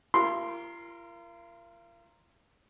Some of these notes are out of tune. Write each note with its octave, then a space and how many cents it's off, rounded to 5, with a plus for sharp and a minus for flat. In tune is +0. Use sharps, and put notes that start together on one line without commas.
F4 -40 A#4 +0 C6 +0